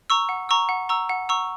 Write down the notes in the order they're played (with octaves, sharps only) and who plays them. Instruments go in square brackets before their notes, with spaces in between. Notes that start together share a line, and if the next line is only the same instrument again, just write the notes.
[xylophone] A#5 C#6 E6
F#5
A#5 C#6 E6
F#5
A#5 C#6 E6
F#5
A#5 C#6 E6